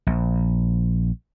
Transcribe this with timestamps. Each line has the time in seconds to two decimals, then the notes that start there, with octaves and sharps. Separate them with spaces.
0.07 A#1